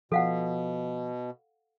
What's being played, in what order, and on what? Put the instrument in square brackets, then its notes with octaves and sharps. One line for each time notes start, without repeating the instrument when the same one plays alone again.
[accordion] B2 [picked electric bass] F3 [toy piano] A4 F5 F#5